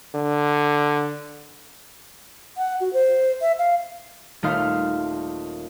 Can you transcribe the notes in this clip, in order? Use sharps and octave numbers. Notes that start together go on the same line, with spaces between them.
D3
F#5
F#4
C5
E5
F5
D#1 A3 D#4 F5 C6